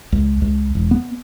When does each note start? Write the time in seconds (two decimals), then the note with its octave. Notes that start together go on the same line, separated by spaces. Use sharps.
0.12 C#2
0.42 C#2
0.75 E1
0.91 B3